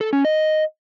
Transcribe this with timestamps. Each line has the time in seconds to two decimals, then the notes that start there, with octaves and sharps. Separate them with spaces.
0.01 A4
0.13 C#4
0.25 D#5